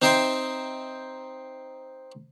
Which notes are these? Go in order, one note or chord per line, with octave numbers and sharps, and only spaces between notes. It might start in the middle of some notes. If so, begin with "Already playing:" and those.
C4 D#4 C5 E5 G5 C6